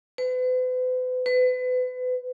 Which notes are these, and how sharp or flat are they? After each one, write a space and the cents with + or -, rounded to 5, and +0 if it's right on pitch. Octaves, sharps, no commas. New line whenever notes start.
B4 +45
B4 +35